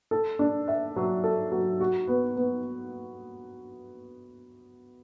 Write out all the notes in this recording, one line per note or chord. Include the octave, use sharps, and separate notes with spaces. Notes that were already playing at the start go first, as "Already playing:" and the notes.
A4
D4
E5
F#3
A4
F#3
F#4
B3
B3